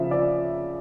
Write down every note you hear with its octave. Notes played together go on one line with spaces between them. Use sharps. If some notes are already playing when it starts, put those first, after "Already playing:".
Already playing: C#3 F3 E5
D5